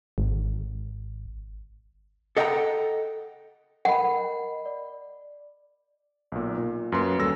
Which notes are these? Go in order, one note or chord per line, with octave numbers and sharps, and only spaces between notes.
G#1
A4 D#5 F#5 G5 A5 A#5
A#4 D#5 F#5 B5
D5
B1 A#2
A#2
F#2 A#3 B4 C6
D#2 G3 C#4 A4 E6 A#6